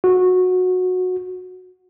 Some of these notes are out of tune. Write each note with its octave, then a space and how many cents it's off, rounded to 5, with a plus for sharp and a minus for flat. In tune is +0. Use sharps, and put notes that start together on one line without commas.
F#4 -15